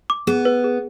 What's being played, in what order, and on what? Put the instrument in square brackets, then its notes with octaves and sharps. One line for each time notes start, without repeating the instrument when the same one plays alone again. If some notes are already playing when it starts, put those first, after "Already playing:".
[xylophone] D6
[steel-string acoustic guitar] B3 [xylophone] G#4
[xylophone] B4
G#4